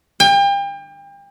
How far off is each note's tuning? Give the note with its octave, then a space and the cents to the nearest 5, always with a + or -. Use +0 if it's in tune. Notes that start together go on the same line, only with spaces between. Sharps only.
G5 +35